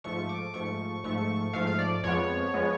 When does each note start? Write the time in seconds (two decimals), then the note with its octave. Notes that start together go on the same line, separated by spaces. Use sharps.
0.04 G#2 F3 A3 C#6
0.29 D6
0.54 G#2 F3 A3 C#6
1.04 G#2 F3 A3 C#6
1.53 G#2 F3 A3 F5
1.67 F5
1.79 D5
2.03 F2 F3 G#3 B3 C#5
2.54 F3 G#3 B3